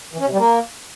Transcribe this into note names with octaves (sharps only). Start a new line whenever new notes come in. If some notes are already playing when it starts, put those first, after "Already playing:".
E3
C#4
C3
G3
A#3